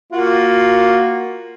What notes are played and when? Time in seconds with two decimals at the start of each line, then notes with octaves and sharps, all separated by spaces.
0.12 A#3 F4 F#4